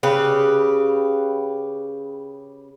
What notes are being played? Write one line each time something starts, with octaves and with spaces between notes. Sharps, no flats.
C#3 G4 B4